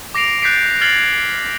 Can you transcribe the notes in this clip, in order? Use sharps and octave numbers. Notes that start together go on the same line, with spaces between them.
D6 A#6 C7 D7 F7
F#6 G6 A6 B6 C7 D7
F6 G#6 A6 C7 F#7